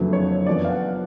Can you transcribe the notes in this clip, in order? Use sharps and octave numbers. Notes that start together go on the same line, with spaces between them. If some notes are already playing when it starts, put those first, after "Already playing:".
Already playing: F#1 F2 D3 F#3 A3 B4
C#5
F#2 F3 B3 D5
F5
F#5